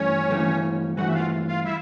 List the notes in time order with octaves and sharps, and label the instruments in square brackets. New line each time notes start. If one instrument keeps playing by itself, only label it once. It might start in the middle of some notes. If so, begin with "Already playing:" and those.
Already playing: [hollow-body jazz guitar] G2 E3 A3 [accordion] C#4 C#5
[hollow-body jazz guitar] G2 E3 A3
[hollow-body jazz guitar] G2 E3 A3 [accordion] F#4 F#5
[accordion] E5
F4 F5
F4 F5
E4 E5